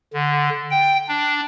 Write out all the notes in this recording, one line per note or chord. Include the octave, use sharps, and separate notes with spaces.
D3
G5
D4